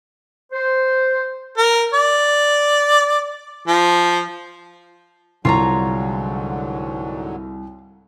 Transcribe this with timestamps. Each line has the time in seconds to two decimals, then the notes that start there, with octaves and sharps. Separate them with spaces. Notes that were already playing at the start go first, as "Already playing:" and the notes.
0.53 C5
1.58 A#4
1.93 D5
3.68 F3
5.45 C2 G#2 D3 F#3 F4 C#5 A#5